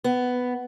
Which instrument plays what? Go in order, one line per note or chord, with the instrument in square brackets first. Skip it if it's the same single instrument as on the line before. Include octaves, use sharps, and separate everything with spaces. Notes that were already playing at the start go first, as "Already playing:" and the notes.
[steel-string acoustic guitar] B3